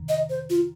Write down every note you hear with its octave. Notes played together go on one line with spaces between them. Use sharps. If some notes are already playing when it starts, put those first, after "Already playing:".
Already playing: F2 C3 D#3
D#5
C5
F4